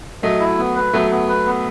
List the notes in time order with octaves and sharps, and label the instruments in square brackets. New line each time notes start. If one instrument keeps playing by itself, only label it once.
[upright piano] F#3 A3 [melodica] D#5
[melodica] E4
B3
B4
[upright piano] F#3 A3 [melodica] B3
[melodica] B3
B4
B3